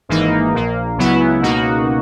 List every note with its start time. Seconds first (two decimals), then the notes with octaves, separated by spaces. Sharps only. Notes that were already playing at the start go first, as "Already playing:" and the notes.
0.09 G#1 G#2 E3 A#3 D#4
0.53 A#1 A#2 A#3
0.97 C#2 C#3 F#3 B3 E4
1.41 C#2 B2 A#3 D#4 F#4